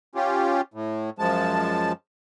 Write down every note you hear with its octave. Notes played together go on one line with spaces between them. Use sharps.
C#4 F4 G4
A2
F#2 F3 G#3 A5